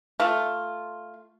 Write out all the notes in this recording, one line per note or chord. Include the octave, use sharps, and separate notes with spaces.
A3 F4